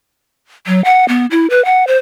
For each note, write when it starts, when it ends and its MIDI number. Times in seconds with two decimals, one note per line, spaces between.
0.67 0.83 54
0.85 1.07 78
1.08 1.26 59
1.31 1.47 64
1.50 1.63 71
1.65 1.86 78
1.87 1.97 72